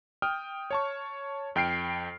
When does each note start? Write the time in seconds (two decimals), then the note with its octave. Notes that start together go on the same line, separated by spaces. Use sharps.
0.22 G5 D#6 F6 G6
0.71 C#5 A5 C#6
1.56 F2 G5 F6 C7 D7